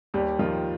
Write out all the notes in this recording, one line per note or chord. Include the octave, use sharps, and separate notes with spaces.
D#2 G3 G4
D#3 F3 F4